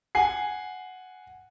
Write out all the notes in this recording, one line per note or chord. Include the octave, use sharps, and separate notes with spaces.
F#5 G#5 C7